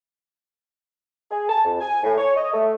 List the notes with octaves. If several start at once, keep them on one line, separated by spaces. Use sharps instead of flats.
G#4
A5
F2
G#5
A2
C#5
D#5
A3